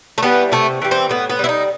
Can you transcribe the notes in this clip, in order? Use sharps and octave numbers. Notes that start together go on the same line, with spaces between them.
A3
E3 G3 B3
C3 A3
E3 G3
C4
A2 B3
B3
G3 E4
D#4